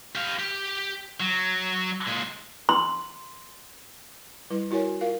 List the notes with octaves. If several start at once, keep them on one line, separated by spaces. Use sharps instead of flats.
G4 F5
G4
F#3
A#2 G#3
C6
G3 E4 B4
E4 F#4 A#4 C#5 G#5
F4 A#4 F5